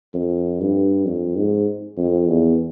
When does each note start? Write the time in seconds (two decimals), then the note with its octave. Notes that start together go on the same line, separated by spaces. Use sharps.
0.14 F2
0.60 G2
1.05 F2
1.36 G#2
1.97 F2
2.28 E2